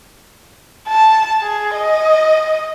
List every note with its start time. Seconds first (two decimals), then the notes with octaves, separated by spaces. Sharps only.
0.89 A5
1.42 G#4
1.74 D#5